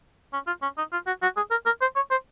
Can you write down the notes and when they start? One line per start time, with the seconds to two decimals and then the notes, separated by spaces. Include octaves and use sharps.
0.33 C#4
0.47 F4
0.62 C#4
0.78 D#4
0.92 F4
1.07 F#4
1.22 F#4
1.37 G#4
1.51 A#4
1.66 A#4
1.81 C5
1.96 C#5
2.11 C5